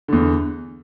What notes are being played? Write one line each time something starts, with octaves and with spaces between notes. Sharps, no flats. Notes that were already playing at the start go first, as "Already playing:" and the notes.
E2 D3